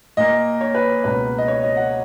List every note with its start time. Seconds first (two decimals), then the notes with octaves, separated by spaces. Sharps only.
0.17 A#2 A#3 D#5
0.61 C#5
0.75 B4
1.04 C#2 B2 A#3 B4
1.38 D#5
1.48 C#5
1.63 D#5
1.77 F#5